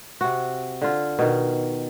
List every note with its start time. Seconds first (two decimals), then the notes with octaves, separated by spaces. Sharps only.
0.21 C3 F#4
0.82 D3 F4
1.19 B2 D#3